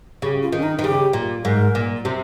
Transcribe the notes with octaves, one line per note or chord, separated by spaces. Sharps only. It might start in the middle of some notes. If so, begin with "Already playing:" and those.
C#3 G4
F4
D#3
C#4
D#4
D#3
C#3 G4
A#2
G#2 A#4
A#2
C3